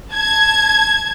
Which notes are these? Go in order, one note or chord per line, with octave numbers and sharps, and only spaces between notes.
A5 G#6